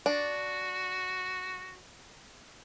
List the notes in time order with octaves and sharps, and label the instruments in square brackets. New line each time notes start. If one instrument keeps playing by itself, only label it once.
[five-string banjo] D4 [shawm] F#4